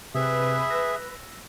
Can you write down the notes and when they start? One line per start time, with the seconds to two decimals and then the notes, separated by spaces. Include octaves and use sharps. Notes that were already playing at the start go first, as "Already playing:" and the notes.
0.15 C3 C4 G#4 B4 E5
0.71 E6 A#6